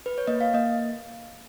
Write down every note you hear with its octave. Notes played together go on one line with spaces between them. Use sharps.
B4
C#5
A#3 D#5
F5
A#3 D#5